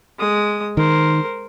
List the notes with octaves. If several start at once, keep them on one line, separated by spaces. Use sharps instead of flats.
G#3 D#6
D#3 A#4 C5